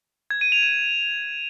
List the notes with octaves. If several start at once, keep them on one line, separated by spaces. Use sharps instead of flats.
G#6
D#7
F7
E7